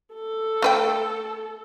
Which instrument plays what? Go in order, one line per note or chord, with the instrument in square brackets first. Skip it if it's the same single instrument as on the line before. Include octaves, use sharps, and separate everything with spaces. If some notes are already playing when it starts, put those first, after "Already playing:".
[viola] A4
[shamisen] A3 B4 G5